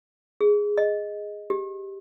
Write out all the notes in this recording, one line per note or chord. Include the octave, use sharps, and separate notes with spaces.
G#4
D#5
G4